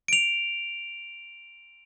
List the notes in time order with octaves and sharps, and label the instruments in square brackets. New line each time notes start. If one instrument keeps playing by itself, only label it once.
[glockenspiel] D7 F7